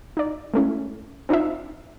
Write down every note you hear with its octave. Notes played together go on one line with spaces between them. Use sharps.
D#4 D5
G#3 A3 C#4 E4
C4 D4 D#4 F4 E5